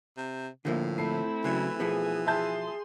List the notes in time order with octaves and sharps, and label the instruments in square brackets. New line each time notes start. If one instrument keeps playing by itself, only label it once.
[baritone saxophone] C3
[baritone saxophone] A2 [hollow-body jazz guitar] D3 F3 A#3
[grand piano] A3 C7 [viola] C4 E4
[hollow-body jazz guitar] C#3 F#3 [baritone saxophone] E3
[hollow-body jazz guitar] B2 F3 B3 [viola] G#4
[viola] G#4 C6 [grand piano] E5 A5 G6